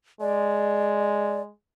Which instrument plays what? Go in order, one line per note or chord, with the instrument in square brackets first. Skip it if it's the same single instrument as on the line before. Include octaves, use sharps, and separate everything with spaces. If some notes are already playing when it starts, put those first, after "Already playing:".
[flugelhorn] G#3 [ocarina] D5